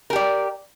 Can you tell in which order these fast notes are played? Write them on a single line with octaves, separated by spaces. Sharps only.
A#4 G4 D5